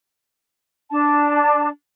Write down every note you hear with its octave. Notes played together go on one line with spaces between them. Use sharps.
D4 A5